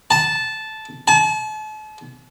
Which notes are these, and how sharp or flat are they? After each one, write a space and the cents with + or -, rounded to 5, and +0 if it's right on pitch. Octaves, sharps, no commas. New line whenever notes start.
A5 -10
A5 -40